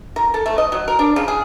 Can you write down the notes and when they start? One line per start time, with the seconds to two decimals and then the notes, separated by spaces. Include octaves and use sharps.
0.16 A#4
0.34 A4
0.46 A3
0.58 D#5
0.72 F#3
0.88 A#4
0.99 D4
1.16 C#3
1.28 G#4